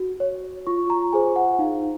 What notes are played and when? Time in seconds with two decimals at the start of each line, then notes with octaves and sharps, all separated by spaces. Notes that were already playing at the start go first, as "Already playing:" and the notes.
Already playing: F#4
0.20 C#5
0.67 F4 C#6
0.90 A#5
1.13 G#4 C5 G#5
1.36 F#5
1.59 D#4 F5